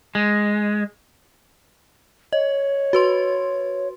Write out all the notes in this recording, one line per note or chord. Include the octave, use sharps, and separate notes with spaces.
G#3
C#5 D#5
F#4 B4 C6